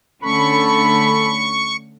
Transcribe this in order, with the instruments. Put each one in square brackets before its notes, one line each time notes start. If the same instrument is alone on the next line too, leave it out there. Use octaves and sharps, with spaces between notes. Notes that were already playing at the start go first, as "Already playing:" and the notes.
[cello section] D3 A3 C#4 [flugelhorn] A4 [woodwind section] B5 [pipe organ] C#6